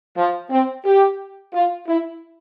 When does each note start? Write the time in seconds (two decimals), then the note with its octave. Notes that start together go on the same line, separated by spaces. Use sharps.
0.17 F3
0.51 C4
0.85 G4
1.53 F4
1.87 E4